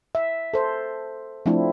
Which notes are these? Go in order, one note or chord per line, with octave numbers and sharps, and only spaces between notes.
E5
A4 C5
F3 A3 C4 D4 E4